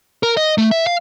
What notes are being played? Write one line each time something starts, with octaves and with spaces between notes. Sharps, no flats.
A#4
D#5
A3
E5
F5